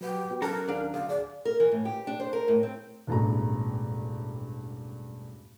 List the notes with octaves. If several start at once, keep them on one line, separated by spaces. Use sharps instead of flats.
F#3 G4 B4 F#5
B3 F#4 B4
F#3 C#4 A4 A#4 A#5 F#6
D#2 D4 F5
D2 F5
G#4 D5
A#4
E3
A2
G4
D4
C5
A#4
A2
C4
E1 A1 G2 A3 A#5